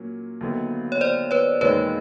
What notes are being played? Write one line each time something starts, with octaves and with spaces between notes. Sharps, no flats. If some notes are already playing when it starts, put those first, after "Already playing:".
Already playing: A#2 F#3 A#3 C#4
D#2 D3 F#3 B3 E4
C#5
C5 D5
B4 C#5
E1 D#2 D#3 G#3 B4 C#5